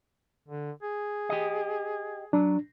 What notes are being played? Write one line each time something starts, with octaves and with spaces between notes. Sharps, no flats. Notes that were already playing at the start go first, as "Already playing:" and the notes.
D3
G#4
G4 D#5
F#3 D4